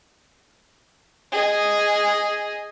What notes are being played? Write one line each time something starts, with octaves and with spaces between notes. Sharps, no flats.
G#4 D#5